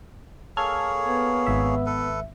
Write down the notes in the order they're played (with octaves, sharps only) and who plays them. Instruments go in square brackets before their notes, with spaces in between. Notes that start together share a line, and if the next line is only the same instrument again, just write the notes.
[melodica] A#3 G#4 C#5 [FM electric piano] A4 F6 G#6
[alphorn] B3
[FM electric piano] G#1 E5
[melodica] A4 B4